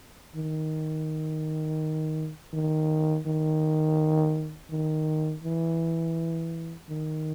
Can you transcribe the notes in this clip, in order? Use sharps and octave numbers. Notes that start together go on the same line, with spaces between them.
D#3
D#3
D#3
D#3
E3
D#3